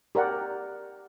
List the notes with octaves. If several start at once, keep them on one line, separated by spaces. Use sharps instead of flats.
G4 A#4 D5 F#5